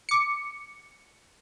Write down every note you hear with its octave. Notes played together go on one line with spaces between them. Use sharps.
D6 C#7